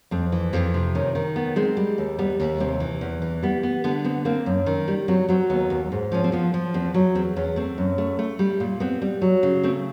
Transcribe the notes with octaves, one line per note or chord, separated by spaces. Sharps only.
F2 C4
E3
F2 C4
C3
D#3 C#4
D#3
B3
G#3 C4
G3
D#2
G3 B3
D#2
C3 C4
E3
E2
E3
G3 B3
B3
D3 B3
B3 C4
A#3 C4
F#2
D#3
G3
F#3 C4
F#3 C4
D#2 B3
D#2
G#2
F3 C#4
C4
F3 B3
F3
E2 C4
F#3
E2 C4
E2 C#4
A3 C4
F#2
A3
A3
G3
A#2
B3 C4
G3
F#3
C#3
A3 C4